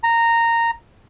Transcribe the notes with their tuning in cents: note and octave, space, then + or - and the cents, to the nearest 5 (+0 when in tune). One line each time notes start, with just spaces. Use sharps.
A#5 -10